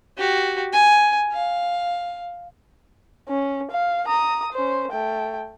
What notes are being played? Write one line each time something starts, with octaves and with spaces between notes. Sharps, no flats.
F#4 G4
G#5
F5
C#4
F5
A#5 D#6
C#4 C5
A3 G5